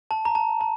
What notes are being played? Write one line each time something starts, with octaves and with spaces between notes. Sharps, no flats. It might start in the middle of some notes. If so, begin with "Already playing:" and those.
A5
A#5
A5
A5